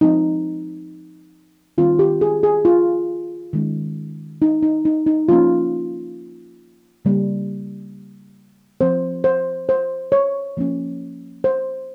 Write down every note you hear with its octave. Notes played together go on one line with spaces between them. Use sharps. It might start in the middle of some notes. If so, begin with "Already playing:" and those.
F3 C4 D#4
D#3 G3 C4 F4
G4
G#4
G#4
F4
D#3 G#3 C#4
D#4
D#4
D#4
D#4
F3 A#3 C#4 F4
C#3 G3 A#3
F3 C4 C5
C5
C5
C#5
F3 A#3 C#4
C5